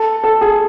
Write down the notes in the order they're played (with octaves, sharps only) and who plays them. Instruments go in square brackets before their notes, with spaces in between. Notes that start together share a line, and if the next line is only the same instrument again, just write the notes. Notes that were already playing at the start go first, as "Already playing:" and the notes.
Already playing: [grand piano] A4
A4
G#4